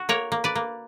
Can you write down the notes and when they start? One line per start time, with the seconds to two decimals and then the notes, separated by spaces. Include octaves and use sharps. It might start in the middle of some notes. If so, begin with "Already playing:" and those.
Already playing: F#4
0.09 A#3 A#4 C#5
0.32 A#3
0.44 B4 D5
0.55 A#3